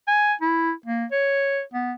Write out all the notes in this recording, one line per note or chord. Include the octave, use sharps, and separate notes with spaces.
G#5
E4
A#3
C#5
B3